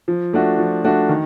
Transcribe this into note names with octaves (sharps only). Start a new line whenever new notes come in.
F3
A3 D4 F#4
F3
A3 D4 F#4
D#3